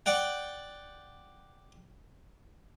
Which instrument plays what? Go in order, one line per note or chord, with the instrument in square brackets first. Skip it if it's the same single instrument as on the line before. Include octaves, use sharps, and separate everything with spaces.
[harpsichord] D5 F#5 G5